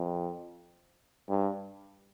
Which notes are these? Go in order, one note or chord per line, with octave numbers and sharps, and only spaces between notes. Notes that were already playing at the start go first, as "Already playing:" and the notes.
Already playing: F2
G2